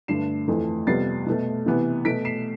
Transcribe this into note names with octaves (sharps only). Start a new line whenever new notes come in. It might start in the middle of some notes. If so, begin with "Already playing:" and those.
G2 D3 A3 C7 E7
F2 E3 A3
F2 C3 G3 B3 A6 C7
B2 A3
C3 E3 B3
B2 A3 B6 D7
C7 E7